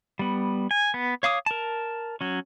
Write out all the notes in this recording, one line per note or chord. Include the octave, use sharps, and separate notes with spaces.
G3 B3
G#5
B3
C#5 F5 D6 D#6
A#4 A5
F#3 C#4